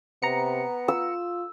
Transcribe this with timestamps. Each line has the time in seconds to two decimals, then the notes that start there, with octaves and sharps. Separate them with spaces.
0.22 C3 B3 A#5 C#7
0.88 F4 E6